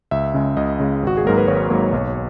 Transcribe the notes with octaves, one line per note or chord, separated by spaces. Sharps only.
C#2 E5
C#3 G#3
C#2 D#5
C#3 G#3
G#1 F#4
G#4
G#2 F#3 A#3 A#4
B4
G#1 C#5
G#2 F#3 A#3
B1